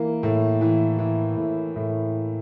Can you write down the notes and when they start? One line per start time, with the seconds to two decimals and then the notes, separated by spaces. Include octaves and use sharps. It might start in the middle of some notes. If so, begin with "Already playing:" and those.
Already playing: E3 A#3
0.23 A2
0.61 E3
0.99 E3
1.37 A2
1.76 A2